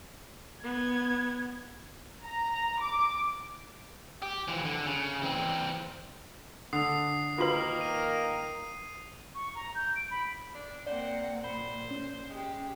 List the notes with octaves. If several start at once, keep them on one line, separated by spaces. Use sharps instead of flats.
B3 G#6
A#5
D6
G4
E3 F3
D3
C#3
E3 C4
D3 D#6 C7 F7
D#3 A#3 F4 F#4 A#4 B4 F5 F#7
D#7
C#6
A#5
G6
D7
B5
D4
A#3 C4 C5 D5 F#5
A#2 C5 B5
C#4
G#3 G4